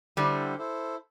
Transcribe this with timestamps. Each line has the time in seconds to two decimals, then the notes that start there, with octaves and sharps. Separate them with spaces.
0.17 D3 G3 E4 A4 C5
0.58 E4 A4 C5